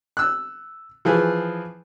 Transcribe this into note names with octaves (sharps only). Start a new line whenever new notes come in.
E6 F#6
E3 F3 G#4 B4